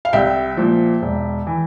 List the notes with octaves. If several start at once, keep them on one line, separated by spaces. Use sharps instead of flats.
F5
C2 E5 G5
A#2 F3
E1
E3